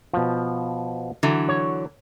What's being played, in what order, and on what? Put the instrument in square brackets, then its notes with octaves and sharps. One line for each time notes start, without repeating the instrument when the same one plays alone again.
[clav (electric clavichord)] B2 F3
[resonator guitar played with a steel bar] D3 E3 F#3
[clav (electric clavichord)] C#5